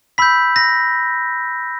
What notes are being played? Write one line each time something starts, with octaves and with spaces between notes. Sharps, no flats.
B5 E6 G6 B6
A#6